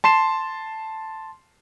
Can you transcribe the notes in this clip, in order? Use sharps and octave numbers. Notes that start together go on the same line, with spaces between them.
A5 C6 C7 E7